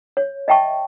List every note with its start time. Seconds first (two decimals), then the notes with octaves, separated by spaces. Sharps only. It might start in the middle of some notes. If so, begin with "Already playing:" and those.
0.17 C#5
0.48 D#5 E5 G5 A5 C#6